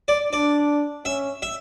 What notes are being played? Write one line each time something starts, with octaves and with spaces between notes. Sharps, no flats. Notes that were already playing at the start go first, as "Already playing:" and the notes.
D5
D4 D5
C#4 E5
E5